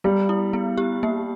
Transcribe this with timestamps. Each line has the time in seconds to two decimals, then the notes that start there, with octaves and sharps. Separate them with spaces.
0.04 G3 B3
0.29 E4
0.53 B3
0.78 G4
1.03 A#3